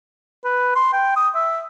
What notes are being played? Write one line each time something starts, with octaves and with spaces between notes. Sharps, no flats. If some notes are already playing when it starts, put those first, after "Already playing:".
B4
C6
G5
D#6
E5